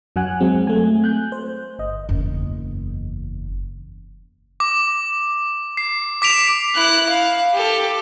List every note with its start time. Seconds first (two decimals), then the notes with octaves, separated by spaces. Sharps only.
0.16 F#2 F#3 F#5 G#5 F#6
0.40 F#3 G#3 C4
0.67 A3 G#5
1.04 F#6 G6
1.32 C5
1.79 G1 D#5
2.09 F#1 E2
4.60 D6
5.77 C7
6.22 D6 B6 D7 F7
6.74 E4 F#6
7.09 F5
7.54 G4 A4